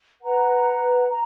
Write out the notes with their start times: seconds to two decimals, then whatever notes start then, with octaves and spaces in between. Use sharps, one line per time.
0.21 B4 F#5 A#5
1.08 A#5